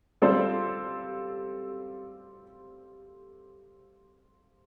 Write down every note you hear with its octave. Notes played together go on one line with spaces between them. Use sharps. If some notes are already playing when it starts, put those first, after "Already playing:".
G3 C4 F4 A4 C5